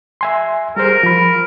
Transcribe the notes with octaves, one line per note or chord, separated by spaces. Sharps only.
E5 G#5 C6
G3 G#4 A#4 C5
F3 B5